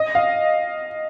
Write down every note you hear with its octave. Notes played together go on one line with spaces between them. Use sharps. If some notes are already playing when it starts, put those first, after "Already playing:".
Already playing: D#5
F5